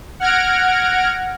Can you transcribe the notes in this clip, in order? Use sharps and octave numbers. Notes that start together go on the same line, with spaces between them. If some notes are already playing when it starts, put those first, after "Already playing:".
F#5 F6 G#6 A#6 D7